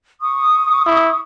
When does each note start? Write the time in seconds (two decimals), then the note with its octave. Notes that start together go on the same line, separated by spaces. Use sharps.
0.21 C#6 D#6
0.87 E4